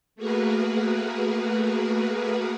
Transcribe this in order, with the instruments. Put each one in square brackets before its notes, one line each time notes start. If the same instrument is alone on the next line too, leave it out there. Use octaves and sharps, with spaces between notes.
[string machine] A3 A#3 F#4 G#4 A#4 B4